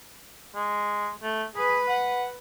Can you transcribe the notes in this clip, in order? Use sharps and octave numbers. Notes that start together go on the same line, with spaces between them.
G#3
A3
G#4 B4
F#5